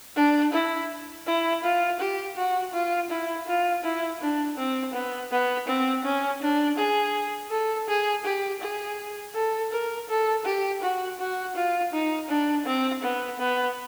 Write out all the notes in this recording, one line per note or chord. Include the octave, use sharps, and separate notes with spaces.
D4
E4
E4
F4
G4
F#4
F4
E4
F4
E4
D4
C4
B3
B3
C4
C#4
D4
G#4
A4
G#4
G4
G#4
A4
A#4
A4
G4
F#4
F#4
F4
D#4
D4
C4
B3
B3